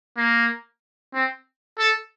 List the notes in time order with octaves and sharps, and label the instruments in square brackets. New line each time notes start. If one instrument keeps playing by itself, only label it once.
[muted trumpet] A#3
C4
A4